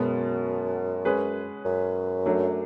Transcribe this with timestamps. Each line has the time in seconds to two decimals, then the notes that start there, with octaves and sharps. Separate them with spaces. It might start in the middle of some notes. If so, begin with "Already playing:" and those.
Already playing: F#2 B2 G#3 B3
1.05 G#3 C#4 G#4 B4
1.66 F#2
2.26 F#3 A3 D4